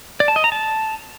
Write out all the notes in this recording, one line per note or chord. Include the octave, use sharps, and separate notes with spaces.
D5
A5
D#5
A#5
A5